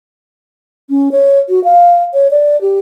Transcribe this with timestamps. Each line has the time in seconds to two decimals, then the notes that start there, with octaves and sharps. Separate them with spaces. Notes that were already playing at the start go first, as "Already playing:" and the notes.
0.90 C#4
1.12 C#5
1.49 F#4
1.64 F5
2.14 C#5
2.31 D5
2.61 G4